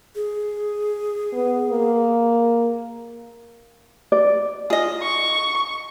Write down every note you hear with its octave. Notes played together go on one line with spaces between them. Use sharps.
G#4
B3
A#3
D5
F4 G#4 D#5
C#6